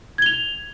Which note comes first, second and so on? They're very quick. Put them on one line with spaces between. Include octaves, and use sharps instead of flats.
G#6 G7 F7